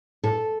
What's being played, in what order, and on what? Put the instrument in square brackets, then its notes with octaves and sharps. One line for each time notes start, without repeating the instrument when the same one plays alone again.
[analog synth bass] A2 [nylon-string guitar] A4